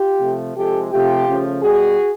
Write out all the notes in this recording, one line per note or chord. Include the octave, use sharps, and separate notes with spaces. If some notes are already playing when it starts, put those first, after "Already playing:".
Already playing: F4 G4
C3 F3 A3
C3 F3 G#3 G4 A4
C3 F3 A3 F4 G4
C#3 F3 A3
B2 G3 F#4 G#4